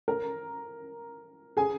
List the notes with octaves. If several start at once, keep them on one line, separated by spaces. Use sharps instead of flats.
A#4 A#5
G#4 G#5